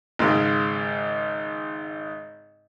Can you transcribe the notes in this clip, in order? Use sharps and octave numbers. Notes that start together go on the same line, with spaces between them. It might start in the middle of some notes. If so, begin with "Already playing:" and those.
G#1 G#2 C#3 G#3